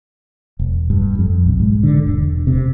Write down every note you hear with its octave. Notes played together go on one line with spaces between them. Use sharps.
E1
G2
F2
B1
G#2
D3
E1
C3